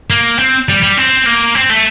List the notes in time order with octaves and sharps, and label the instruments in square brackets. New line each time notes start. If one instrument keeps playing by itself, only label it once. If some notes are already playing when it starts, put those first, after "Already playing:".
[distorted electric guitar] A#3
C4
G3
G3
C4
A#3
C4
A3